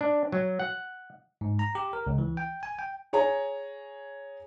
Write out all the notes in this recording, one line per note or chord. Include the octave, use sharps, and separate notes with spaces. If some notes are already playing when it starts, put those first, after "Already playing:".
D4
F#3
F#5
G#2
A#5
G4
A#4
C#2
E3
G5
G#5
G5
G#4 C#5 G#5 A#5